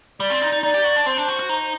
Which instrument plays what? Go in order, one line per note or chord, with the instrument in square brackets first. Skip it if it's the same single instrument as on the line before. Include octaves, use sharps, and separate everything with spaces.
[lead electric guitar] G3 [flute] D5
[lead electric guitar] C4
D#4
D#4
[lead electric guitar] D#4 [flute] D5
[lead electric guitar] G4
F#4
D4
[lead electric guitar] C4 [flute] C5
[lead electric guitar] D4
F#4
F#4
D#4